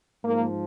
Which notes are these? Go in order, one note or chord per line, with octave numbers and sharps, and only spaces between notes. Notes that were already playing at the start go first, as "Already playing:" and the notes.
G#2 F3 A#3